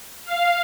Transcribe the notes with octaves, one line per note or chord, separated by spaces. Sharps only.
F5